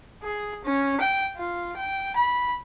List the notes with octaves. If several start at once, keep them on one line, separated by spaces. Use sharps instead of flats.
G#4
C#4
G5
F4
G5
B5